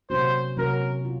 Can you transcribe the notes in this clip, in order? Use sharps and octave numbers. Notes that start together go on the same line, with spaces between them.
C3 F#3 A#3 C#4 F#4 C5
C3 F#3 A#3 C#4 F#4 A#4
F4